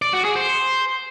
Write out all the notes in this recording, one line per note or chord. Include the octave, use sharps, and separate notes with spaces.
D5
F#4
G#4
C5